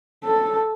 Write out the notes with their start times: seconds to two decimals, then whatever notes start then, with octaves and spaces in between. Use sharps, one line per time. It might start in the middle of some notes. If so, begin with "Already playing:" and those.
0.24 A4